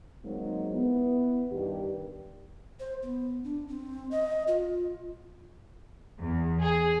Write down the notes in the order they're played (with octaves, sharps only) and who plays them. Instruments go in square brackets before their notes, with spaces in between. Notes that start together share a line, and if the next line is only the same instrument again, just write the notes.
[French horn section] D#3 F#3 G#3 A#3 C4 D#4
B3 E4
G2 D#3 G4
[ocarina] C5
B3
D4
C4
D#5
F4
[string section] E2
G#4